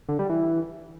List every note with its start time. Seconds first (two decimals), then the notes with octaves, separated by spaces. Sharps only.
0.09 D3
0.19 G3
0.29 E3